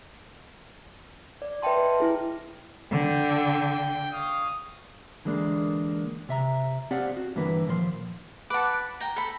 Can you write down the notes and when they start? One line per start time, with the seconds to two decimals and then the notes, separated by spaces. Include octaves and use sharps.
1.42 D5
1.62 B4 D#5 E5 G5 A5 C6
2.00 E4 G#4
2.91 D3 G5
4.11 C#5 F5 D#6
5.25 D3 E3 G#3 A#3 D4
6.29 C3 E5 A#5
6.91 C4 G4 D5 F5 F#5
7.17 F#4
7.36 G2 D3 E3 A#3 B4
7.67 D#2 A#2 F3 A#4 C6
8.50 B4 F#5 A5 D6
9.00 G5 A#5
9.16 A4 B5